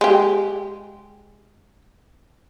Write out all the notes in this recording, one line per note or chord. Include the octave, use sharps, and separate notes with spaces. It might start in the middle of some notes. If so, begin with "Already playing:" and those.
G#3 G4